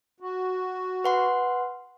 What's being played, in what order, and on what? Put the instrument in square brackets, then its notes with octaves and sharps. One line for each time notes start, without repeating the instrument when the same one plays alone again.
[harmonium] F#4
[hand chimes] B4 F#5 C6